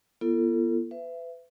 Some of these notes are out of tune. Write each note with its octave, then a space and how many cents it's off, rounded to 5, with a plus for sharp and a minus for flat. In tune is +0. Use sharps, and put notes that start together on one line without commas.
B3 -35 F4 -45 A4 +25
B4 +35 E5 +30